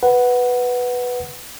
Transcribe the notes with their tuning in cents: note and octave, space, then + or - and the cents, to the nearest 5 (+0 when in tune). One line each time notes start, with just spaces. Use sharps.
B4 +0 F#5 +0